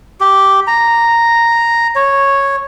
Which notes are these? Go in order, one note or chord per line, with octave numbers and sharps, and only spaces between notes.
G4
A#5
C#5